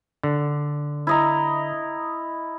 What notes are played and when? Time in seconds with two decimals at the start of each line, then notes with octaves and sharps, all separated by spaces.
0.23 D3
1.07 E4 D#5 A#5